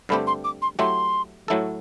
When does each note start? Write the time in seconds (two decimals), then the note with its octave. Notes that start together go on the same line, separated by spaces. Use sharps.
0.09 G2 D3 A3 C4 G4 B5
0.27 C6
0.44 D6
0.62 C6
0.79 F#3 A3 E4 G4 C6
1.48 A2 F#3 A3 E4 A4